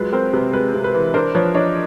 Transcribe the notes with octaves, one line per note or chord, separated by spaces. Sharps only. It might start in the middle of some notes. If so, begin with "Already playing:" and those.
Already playing: F#3 G#3 F4 B4
C4 A#4 C5
C3 B4
G#3 B4
C3
B4
E3
D4 A#4 C5
F3 B4 C#5
D4 C#5 D#5